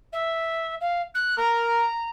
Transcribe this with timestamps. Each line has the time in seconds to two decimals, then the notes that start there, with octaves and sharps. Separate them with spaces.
0.12 E5
0.80 F5
1.14 F#6
1.38 A#4 A#5